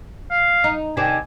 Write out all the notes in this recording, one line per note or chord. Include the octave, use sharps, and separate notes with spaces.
F5
D#4
C3 D#3 D4 G#5